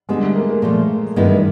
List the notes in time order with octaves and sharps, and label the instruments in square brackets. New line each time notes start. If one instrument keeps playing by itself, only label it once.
[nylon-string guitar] D3 G3 B3 [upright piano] G#3
[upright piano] A3
A#3
A#3
[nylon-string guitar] A#2 F3 A3
G2 D#3 G#3 B3 E4